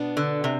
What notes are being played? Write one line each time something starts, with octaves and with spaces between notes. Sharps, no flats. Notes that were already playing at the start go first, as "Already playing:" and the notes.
Already playing: B2 B3 D4
D3
C3